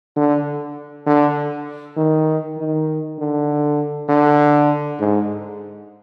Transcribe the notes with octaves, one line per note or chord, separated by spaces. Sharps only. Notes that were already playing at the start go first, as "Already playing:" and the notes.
D3
D3
D#3
D#3
D3
D3
G#2